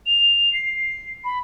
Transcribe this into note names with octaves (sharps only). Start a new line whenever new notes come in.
F7
C7
B5